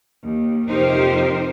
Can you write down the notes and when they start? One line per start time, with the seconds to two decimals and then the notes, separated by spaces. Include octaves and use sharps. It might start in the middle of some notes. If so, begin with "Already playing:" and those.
0.23 D#2
0.67 F2 C3 D#4 G4 A#4 C5